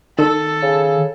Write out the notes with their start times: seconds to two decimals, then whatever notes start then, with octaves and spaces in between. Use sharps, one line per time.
0.18 D#3 A4
0.62 C#3